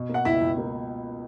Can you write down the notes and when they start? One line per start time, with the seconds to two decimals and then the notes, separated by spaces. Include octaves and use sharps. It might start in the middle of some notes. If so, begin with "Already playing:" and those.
Already playing: B2
0.09 A#3
0.14 F#5
0.25 C#2 E4 E5
0.41 C#2
0.57 A#3